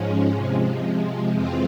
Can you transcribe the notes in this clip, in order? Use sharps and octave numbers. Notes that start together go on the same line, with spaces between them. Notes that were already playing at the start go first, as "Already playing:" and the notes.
Already playing: G#2 F3 G#3 C#4
C3 F3 G#3
F2 E3 G#3 C4 F4